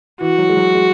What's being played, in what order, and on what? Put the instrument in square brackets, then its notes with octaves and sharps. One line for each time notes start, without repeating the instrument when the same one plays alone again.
[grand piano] E3 [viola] F#4
[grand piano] F#3
G#3
F#3
G#3